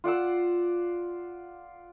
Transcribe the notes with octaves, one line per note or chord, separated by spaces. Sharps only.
F4 D5 F#5 E6